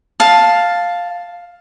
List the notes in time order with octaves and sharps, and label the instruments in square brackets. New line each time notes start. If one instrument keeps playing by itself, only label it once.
[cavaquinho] F5 A5